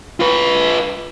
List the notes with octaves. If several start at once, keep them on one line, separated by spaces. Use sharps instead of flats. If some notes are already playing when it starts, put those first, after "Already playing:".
F4 B4